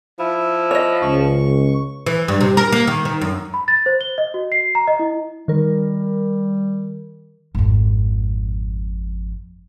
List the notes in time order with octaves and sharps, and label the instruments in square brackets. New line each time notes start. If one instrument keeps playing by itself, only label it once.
[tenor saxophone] F3 [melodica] E4
[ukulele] C#5 D#5
[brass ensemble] C#2 [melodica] C#6
[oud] E3
G2
C3
A#4
A#3
D#3
D#3
F#2
[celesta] B5
A6
C5
G7
D#5
F#4
C7
A#5
D#5
E4
[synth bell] D#3 A#4 [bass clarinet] G3
[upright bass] G#1 F2